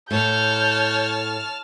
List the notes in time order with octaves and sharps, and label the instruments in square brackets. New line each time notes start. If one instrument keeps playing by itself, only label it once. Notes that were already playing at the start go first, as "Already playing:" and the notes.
[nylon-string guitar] A2 [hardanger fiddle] C#5 [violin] A5 F6 [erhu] G6